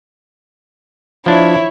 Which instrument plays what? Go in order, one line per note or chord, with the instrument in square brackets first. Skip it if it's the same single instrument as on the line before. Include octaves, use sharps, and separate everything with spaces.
[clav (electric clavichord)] F3 D4 [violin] E4 C#5